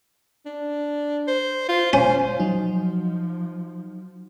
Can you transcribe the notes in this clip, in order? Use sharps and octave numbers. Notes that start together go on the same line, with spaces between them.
D4
C5
F4
C#4 C5
F3 F#3 D#4